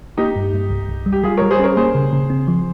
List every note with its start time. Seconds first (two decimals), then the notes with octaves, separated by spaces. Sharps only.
0.17 A#3 D#4 G4
0.36 G2
0.53 G2
0.70 C2
0.89 C2
1.06 G3
1.12 G4
1.23 G3 F4 G#4
1.37 G3 A#4 C#5
1.51 G#4 C5
1.60 C#4 A#4 C#5
1.77 A#3 G#4 C5
1.95 C#3
2.13 C#3
2.30 C4
2.48 F3